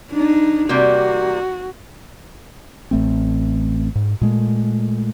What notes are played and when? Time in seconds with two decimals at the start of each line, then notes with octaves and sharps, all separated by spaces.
0.12 D4 D#4
0.69 C3 G3 A#3 F#4
2.91 A1 A3 C4
3.95 G#2
4.21 A#2 G#3 A3